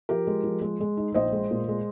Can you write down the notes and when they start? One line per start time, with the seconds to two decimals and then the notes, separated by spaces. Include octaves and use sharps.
0.09 F3 G4 A#4
0.27 G#3
0.44 F3
0.62 G#3
0.80 G#3
0.97 D#4
1.14 A#1 C5 D#5
1.32 G#3
1.51 A#2
1.68 G#3